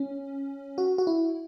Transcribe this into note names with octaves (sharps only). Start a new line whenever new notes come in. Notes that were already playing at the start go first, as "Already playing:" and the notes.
Already playing: C#4
F#4
F#4
E4